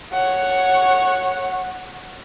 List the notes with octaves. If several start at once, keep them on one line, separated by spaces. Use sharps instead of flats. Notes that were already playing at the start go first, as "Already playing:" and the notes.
C#5 F#5